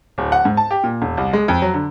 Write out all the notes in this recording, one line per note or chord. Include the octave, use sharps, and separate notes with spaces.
D1
F#5
G#2
A5
G4
A#2
E1
C2
G#3
F2
F#3
D3